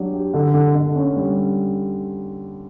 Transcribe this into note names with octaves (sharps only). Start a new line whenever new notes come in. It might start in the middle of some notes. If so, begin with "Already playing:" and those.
Already playing: F#3 D4 G4
G4
D3
D3
D3
C#4
G3
C#4